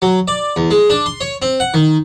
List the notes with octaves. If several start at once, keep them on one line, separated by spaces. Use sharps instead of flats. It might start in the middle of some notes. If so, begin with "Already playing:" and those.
F#3
D5
E2
G#3
D4
C6
C#5
C4
F#5
D#3